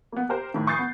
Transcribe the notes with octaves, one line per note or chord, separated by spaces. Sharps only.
A#3 B3
G4 A#4 C5
A2 D#3
B5 C#6 D#6 G6 A6 C7
B3